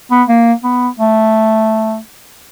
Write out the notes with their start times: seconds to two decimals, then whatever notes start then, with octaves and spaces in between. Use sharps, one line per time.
0.11 B3
0.28 A#3
0.64 B3
0.99 A3